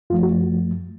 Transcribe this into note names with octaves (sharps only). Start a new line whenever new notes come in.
F#2 F3 A3 F4
F#4